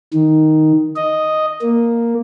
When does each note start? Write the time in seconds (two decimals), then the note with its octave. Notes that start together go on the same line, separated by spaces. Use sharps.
0.14 D#3
0.96 D#5
1.62 A#3